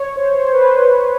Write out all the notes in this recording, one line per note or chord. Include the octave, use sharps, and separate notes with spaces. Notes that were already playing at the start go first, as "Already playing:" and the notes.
Already playing: C#5
C5
C#5
C5
B4
C5